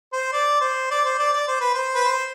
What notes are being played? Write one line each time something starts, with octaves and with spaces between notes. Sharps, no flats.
C5
D5
C5
D5
C5
D5
D5
C5
B4
C5
B4
C5